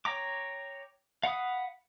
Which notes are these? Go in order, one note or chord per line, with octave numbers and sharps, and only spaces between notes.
C#5 G5 A#5 D6
F5 F#5 B5 D#6